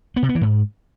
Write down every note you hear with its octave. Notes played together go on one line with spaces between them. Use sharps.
B3
C3
B3
E3
G#2